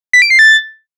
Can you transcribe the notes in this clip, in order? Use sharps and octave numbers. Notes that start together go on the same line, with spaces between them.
B6
D7
C7
A6